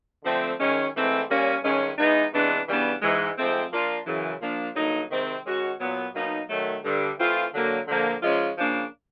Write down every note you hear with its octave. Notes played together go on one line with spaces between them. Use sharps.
D3 F3 A3 C4
F#2 D#3 G#3 C#4
G#2 E3 A3 C4 E4
A#2 G3 A#3 C#4
G2 D#3 G#3 C#4
E3 G#3 B3 D#4
C3 E3 G#3 B3 D4
C#3 E3 G3 B3 D4
G#2 E3 G#3
G#2 F3 A3 C4
F3 A#3 D4 F4
F#2 C#3 E3
F3 A#3 D4
G2 D3 F#3 A#3 D#4
C3 D#3 G#3 C4
D#3 G#3 C#4 F#4
A#2 F#3 B3
B2 F#3 A#3 D#4
D#3 F#3 A3
G2 D3 G3
E3 A3 C4 F4
D3 F#3 A#3
D3 F3 A#3
G#2 F3 G#3 C#4 F4
C#3 F3 A#3 D4